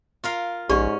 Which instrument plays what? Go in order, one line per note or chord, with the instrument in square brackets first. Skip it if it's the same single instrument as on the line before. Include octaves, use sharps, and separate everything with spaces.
[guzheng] F4 A#4 F5
[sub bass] A#1 [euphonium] G#2 [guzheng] C#4 [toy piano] G4 D5 C#6